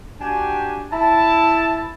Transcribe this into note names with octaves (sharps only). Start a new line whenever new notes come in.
D4 F#4 G4 G5 G#5
E4 A5